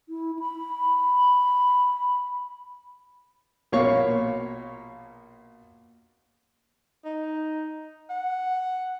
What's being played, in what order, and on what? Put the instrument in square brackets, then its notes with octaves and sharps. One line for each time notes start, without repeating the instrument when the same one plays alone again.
[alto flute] E4
B5
[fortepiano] A#1 B2 A#3 C#5 F5 C#6
[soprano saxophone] D#4
F#5